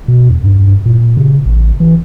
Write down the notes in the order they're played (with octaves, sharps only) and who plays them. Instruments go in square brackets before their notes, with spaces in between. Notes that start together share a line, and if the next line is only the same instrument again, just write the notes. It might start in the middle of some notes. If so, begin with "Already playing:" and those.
[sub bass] B2
E2
G2
A#2
C#3
A1
E3